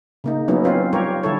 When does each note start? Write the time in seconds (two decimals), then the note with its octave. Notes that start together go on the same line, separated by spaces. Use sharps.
0.24 C#3 A#3 D#4
0.48 F#3 A#3 B3 C#4 D#4 E4
0.64 C4 C#4 F4 B4
0.93 G3 F4 G4 A#4 C#5
1.23 D3 G3 E4 A4 C#5